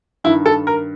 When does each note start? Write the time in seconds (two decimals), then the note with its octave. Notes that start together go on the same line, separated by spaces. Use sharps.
0.24 G2 D#3 E4
0.46 A4
0.67 A#4